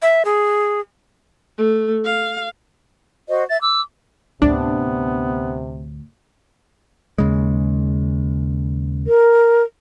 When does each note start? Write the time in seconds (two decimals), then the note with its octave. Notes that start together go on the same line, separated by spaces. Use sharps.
0.02 E5
0.25 G#4
1.58 A3
2.05 F5
3.29 F#4 C5 D#5
3.49 E5 A6
3.62 D6 E6
4.42 D2 A2 C3 B3 D4
7.18 D#2 C#3 G#3
9.07 A#4